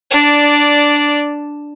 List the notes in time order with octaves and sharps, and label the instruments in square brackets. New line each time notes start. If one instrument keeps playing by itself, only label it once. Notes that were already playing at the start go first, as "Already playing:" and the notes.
[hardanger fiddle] D4 D5